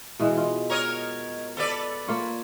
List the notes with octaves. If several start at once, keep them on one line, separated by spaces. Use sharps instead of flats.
B2 E3 G#3
F4
A#4 C#5 D#5
A4 B4 D5
A#3 F4 C#5